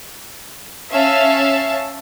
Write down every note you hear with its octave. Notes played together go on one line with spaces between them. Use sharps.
C#4 E5 F5 A5